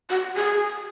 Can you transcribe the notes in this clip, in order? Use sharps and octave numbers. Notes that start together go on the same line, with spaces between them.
F#4
G#4